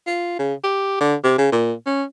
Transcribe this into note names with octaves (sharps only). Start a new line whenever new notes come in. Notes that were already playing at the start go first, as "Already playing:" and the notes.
F4
C#3
G4
D3
C3
C#3
A#2
C#4